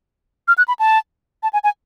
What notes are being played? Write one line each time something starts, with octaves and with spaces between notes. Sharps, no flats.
F6
F#6
B5
A5
A5
G#5
G#5